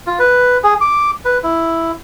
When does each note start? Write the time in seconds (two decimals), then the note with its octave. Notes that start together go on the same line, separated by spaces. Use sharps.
0.07 F4
0.19 B4
0.64 G#4
0.81 D6
1.25 B4
1.43 E4